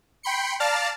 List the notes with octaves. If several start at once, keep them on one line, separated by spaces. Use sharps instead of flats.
G5 B5 C6 C#7
D5 F5 A5 A#5 F6 A6